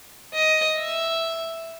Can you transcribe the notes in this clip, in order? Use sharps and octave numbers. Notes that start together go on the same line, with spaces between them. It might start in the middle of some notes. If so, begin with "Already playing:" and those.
D#5
E5